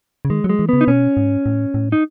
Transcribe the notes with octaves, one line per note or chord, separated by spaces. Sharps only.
C#3
D#3 G#3
F#3
G#3
E3
C#3 B3
D#4
B2 C#4
G#2
A2
A2
D#4